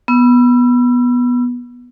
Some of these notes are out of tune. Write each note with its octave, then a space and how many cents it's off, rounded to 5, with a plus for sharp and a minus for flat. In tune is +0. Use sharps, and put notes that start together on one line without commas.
B3 -10 E6 +30